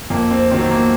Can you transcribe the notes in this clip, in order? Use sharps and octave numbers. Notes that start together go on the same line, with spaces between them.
F2 A#3
C4
D#3 F#3 C4
A#3